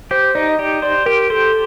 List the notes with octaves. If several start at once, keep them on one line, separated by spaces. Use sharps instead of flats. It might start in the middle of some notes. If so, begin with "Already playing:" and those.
G4 C5
D#4 D5
D#5
G4 D5
C5 D5
G4 A#4
A4 C5